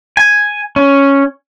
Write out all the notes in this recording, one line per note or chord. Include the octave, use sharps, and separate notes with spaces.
G#5
C#4